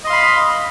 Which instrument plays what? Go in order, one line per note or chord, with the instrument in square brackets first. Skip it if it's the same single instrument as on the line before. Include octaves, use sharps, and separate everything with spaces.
[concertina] D#5
C6
F5
B5